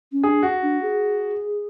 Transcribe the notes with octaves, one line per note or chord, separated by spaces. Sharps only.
C#4
D4 G#4
F#4
D4
G#4